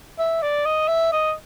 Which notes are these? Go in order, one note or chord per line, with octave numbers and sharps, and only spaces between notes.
E5
D5
D#5
E5
D#5